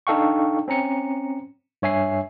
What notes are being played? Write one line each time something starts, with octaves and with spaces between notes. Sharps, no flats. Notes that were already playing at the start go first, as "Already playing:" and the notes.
D4 D#4 A4 F5 G5 C#6
C4 C#4 A#5 C#7
G2 C#5 E5 G#5 C7